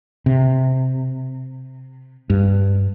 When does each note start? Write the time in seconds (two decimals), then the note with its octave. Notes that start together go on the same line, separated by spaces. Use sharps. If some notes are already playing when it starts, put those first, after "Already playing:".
0.26 C3
2.30 G2